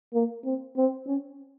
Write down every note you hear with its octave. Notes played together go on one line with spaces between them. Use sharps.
A#3
C4
C4
C#4